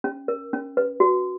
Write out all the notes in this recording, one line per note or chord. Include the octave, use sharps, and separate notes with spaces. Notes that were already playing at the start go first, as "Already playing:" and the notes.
C#4
A#4
C#4
B4
F#4